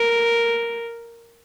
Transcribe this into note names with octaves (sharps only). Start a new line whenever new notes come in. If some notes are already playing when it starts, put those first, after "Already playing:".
Already playing: A#4